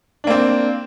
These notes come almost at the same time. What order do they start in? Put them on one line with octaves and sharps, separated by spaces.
D4 A#3 C4